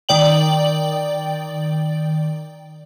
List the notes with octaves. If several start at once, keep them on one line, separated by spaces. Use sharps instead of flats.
D#3 D5 G5 F#7